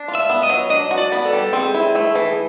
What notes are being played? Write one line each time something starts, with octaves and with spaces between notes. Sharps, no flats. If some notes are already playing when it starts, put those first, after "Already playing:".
Already playing: D4
F4
E5
B3
D#5
F#3
D4 D#5
F#4
D5
B3
A4
G3
C4 G#4
E4
A3
E3